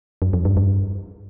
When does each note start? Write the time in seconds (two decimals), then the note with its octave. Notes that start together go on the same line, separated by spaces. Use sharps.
0.22 F#2
0.33 F2
0.45 G2
0.57 G2